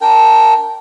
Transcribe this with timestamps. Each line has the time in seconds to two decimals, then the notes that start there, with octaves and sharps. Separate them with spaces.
0.01 D4 A#4 G5